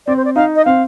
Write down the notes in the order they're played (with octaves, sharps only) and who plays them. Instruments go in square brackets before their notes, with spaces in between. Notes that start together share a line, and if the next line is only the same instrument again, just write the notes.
[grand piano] C4 [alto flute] D5
[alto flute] C5
D5
[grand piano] D#4 [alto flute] F5
[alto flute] D#5
[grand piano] C4 [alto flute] F5